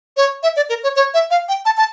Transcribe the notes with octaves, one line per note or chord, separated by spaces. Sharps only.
C#5
E5
D5
A#4
C#5
C#5
E5
F5
G5
A5
A5